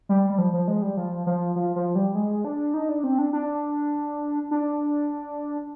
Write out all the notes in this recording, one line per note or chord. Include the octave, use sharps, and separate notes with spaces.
G3
G3
F3
F3
G#3
G3
F3
F3
F3
F3
G3
G#3
D4
D#4
D4
C4
D4
D4
D4